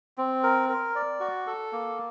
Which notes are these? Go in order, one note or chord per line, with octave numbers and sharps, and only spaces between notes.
C4
A#4
A#4
D5
F#4
A4
A#3